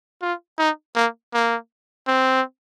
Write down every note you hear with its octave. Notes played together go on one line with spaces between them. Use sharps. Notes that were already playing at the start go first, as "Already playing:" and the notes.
F4
D#4
A#3
A#3
C4